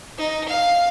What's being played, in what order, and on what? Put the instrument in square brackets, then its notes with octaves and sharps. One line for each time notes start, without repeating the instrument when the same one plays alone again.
[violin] D#4
F5